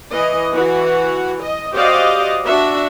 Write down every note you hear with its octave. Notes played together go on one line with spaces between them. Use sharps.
E3 D#5
E3 F#4
D#5
F#4 G4 C5 D5 D#5 F5
D4 F#4 E5